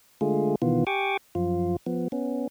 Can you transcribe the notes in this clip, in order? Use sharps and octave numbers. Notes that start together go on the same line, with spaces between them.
D3 G#3 A3 F4 G#4
B2 D#3 E3 B3 F4
G4 G5 G#5 C#6 D6
F#2 F3 F4
F3 B3
B3 C#4